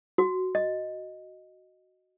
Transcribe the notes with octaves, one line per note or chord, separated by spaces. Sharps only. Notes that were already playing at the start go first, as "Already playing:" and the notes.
F#4
D#5